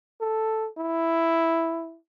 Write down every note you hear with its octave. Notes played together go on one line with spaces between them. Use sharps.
A4
E4